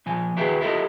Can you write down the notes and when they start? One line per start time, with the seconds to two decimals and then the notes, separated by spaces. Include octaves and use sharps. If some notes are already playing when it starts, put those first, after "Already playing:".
0.06 A#2 F3 G#5
0.36 D#2 E4 F#4 G#4 B4 G5
0.61 E4 F4 G4 A4 A#4 D#5